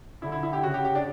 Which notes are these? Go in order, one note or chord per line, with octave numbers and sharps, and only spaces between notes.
D3 E4
E4
E4
G4
C#3 F#4
G4
G4
D4